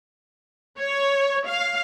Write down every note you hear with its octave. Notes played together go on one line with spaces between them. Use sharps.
C#5
F5